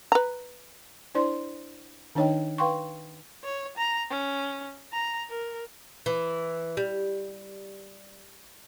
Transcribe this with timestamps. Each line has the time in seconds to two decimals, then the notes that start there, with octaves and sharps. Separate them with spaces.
0.12 B4 A#5
1.15 D4 E4 C5 D5 C6
2.15 D#3 D4 D#4 C#5 D#5 G5
2.58 B4 F5 G5 C6 C#6
3.44 C#5
3.77 A#5
4.10 C#4
4.92 A#5
5.29 A#4
6.06 E3
6.77 G3